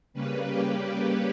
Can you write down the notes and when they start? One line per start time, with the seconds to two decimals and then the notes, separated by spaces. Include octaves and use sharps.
0.13 C#3 G3 A#3 C#4 B4
0.45 G4
0.77 G4